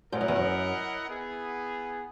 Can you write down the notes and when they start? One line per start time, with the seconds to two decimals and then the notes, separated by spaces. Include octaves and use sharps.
0.12 G#2 E4 A#4 D#5 F#5
0.21 F#2
0.28 E2
0.36 F#2
1.08 B3 E4 G#4